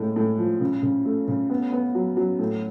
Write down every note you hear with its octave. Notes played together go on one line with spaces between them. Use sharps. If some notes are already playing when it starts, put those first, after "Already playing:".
Already playing: A2 G#3
A2
F3
C#3
C#3
A3
C#3
B3
B3
F#3
F#3
A2